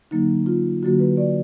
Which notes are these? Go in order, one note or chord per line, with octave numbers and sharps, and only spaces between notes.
D3 F#3 A#3 D#4
F4
D3 F#3 A#3 F#4
B4
D5